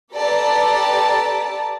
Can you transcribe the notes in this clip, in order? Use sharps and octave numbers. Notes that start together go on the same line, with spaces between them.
G4 A4 B4 D5 A5 A#5